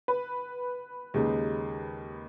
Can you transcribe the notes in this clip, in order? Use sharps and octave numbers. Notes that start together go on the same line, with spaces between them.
B4
D#2 C#3 G#3 D#4 G4